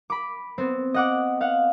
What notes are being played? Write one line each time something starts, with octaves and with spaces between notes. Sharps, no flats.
B5 D6
B3 C4
D#5 F#5 D6
F5 F#5